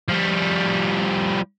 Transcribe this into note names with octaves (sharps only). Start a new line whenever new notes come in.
F3 G3